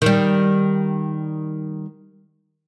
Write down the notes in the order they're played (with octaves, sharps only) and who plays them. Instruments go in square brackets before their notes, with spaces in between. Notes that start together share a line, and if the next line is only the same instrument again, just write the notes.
[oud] D#3 G3